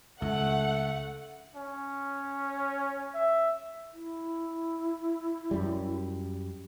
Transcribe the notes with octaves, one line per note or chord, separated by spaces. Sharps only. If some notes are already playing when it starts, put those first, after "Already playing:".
C#2 A3 F#5
C#4
E5
E4
F#2 G3